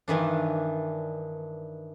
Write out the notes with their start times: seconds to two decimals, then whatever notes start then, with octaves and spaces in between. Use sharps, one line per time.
0.08 G2 D#3 E3 D4